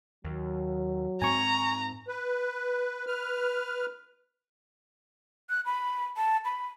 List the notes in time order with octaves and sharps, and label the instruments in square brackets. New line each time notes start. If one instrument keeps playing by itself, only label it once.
[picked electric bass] D#2 [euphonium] F#3
[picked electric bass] G#2 C4 [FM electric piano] G#5 C#6 [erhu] A#5
[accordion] B4
B4 F6
[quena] F#6
B5
A5
B5